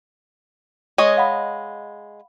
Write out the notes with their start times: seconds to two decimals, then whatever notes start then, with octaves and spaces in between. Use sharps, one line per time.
0.98 G#3 C#5 D#5
1.17 F5 F#5 B5